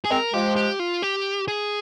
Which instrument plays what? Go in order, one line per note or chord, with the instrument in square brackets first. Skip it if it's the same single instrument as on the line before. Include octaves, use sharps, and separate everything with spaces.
[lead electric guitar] G#4
[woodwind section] G#3 C4 [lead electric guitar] A#4
[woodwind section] F3 G#3 [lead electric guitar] G4
[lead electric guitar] G4
F4
G4
G#4